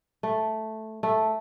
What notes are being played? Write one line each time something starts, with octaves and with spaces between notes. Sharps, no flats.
A3
A3